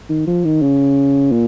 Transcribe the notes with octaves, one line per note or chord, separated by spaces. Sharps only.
D#3
F3
D#3
C#3
A#2